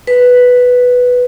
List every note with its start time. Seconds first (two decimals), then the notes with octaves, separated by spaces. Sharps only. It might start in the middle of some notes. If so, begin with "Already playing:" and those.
0.07 B4